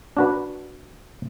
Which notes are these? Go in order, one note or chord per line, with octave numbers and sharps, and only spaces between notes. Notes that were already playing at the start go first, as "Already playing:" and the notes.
D4 F#4 B4